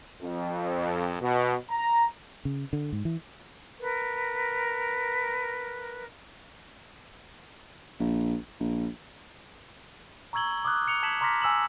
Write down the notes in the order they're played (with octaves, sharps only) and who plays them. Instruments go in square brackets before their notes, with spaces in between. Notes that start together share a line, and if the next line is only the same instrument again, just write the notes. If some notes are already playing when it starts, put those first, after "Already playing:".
[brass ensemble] F2
B2
A#5
[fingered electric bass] C#3
D3
G#2
E3
[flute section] A#4 B4
[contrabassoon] A#1
A#1
[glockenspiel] A#5 C#6 E6 G#6 F#7 G7
D6 D#6 F6 F#6
F#6 C#7 F7 G7
A5 G#6 B6 E7 F#7
A#5 C6 D6 F6 A#6 B6
G#5 E6 E7 F#7